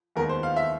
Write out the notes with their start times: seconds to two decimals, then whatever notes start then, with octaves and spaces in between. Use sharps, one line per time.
0.16 D#2 D#3 G#3 B3 A#4
0.29 C5
0.43 F5
0.56 E5